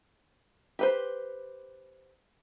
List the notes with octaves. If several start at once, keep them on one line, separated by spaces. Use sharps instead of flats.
G4 B4 C5